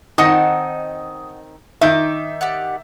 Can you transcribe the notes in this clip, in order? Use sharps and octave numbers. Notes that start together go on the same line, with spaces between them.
D#3 C4 D#4 D#5 F#5 A5 D#6 A#6
D#3 D#4 E5 D6 G6
G4 D5 F#5